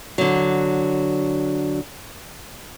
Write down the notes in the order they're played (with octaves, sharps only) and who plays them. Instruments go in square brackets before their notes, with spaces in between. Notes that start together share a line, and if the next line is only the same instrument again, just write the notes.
[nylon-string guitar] D3 F#3